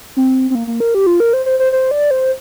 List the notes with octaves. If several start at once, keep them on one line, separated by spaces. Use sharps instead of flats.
C4
C4
A#3
A#3
A#4
G4
F4
A#4
C5
C5
C5
C5
D5
C5